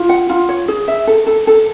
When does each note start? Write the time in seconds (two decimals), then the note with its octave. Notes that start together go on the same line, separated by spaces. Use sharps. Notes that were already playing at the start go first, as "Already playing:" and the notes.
Already playing: F4
0.09 F#5
0.30 F4
0.49 C#5
0.68 G#4
0.88 E5
1.07 A4
1.27 A4
1.47 A4